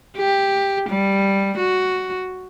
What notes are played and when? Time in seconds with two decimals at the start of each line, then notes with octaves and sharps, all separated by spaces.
0.17 G4
0.89 G3
1.58 F#4